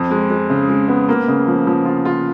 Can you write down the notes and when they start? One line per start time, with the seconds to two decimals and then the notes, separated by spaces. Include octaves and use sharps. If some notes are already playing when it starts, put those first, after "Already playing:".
Already playing: F2
0.10 G#3
0.30 G#3
0.50 C#3
0.68 G#3
0.88 B3
1.09 A#3
1.28 C#3
1.47 F3
1.67 F3
1.85 F4
2.05 F4